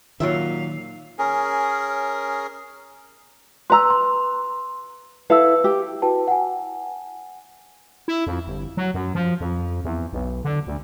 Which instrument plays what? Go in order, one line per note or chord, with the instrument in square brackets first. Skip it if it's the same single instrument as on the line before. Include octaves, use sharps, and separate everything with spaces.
[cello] A#2 F5 [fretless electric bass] D#3 [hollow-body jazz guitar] F#3 F4 E5
[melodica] C#4 G#4 A#4
[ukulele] B4 A#5 [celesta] C6 E6
[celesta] C6
[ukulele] E4 A4 F5 [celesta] B4 E6
[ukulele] G4
[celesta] E4 F#4 B4 G5 A5
F#5 G#5
[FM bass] E4
F2
G1
F#3
F#2
F3
F2
E2
B1
D3
D2